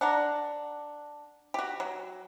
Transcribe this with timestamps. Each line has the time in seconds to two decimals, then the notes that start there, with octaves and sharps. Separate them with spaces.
0.01 D4 F#5 A#5
1.54 F#4 G4
1.80 F#3